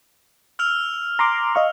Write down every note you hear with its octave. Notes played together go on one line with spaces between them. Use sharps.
E6 F6 F7
A#5 C6 D6
D#5 F5 C#6